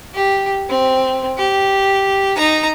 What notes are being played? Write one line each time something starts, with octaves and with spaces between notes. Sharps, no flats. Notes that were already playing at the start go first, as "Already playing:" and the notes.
G4
C4
G4
D#4 A#5